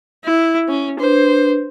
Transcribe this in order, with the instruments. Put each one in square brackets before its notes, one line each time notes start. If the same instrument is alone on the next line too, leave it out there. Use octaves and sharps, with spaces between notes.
[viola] E4
C#4
[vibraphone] D4 B4 [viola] C5